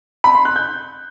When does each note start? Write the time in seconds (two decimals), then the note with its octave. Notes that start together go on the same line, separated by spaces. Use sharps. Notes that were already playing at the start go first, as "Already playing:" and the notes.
0.24 B5
0.35 C6
0.45 F#6
0.56 G6